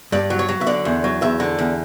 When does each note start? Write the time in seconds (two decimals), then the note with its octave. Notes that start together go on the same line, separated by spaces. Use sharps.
0.12 G2 D5
0.30 F#3
0.39 C#5
0.49 F#3
0.61 E5
0.67 D3 D5
0.85 E2
1.04 F#3
1.22 E2 E5
1.40 D3
1.59 E2